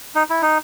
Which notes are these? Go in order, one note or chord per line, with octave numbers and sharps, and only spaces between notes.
D#4
E4
D#4